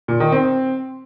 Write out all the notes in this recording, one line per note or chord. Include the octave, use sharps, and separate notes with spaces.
A#2
D#3
C4